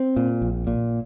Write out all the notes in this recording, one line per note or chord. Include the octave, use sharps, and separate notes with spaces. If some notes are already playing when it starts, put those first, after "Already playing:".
Already playing: C4
A#2
A#1
A#2